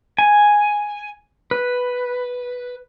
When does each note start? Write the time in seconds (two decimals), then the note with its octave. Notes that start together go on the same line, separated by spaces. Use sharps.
0.18 G#5
1.51 B4